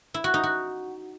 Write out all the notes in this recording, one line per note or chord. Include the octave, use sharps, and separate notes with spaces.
E4
F#4
D#4
F#4